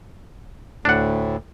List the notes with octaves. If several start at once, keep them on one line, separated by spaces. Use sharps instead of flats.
D2 A2 D4 F#5